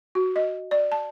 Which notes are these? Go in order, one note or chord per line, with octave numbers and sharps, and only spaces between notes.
F#4
D#5
D5
A5